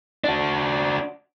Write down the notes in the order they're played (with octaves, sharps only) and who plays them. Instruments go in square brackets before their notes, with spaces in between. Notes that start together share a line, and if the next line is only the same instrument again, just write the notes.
[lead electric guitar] D4 F#4